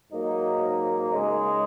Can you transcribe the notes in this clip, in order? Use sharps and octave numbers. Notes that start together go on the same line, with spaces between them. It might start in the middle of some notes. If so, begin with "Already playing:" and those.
G#2 F#3 A#3 D#4
C#3 G#3 D#4